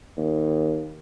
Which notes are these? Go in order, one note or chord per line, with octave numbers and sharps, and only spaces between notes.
D#2